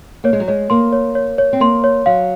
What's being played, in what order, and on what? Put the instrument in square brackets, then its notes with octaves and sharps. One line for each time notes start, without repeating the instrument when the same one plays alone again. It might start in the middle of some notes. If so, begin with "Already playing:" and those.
[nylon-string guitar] A#3 [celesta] C#5
[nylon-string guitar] G#3
F#3
[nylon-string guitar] G#3 [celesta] C#5
[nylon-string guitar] A#3 [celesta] C6
[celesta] C#5
C#5
C#5
[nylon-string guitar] C4
[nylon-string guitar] A#3 [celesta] C6
[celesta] C#5
[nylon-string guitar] F#3 [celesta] F5